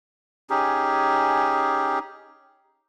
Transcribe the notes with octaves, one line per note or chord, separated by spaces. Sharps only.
C#4 D#4 G4 G#4